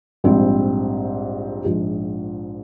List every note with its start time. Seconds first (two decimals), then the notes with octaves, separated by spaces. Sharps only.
0.24 A#1 G#2 G3 C4
1.64 A#1 G#2 F3 G#3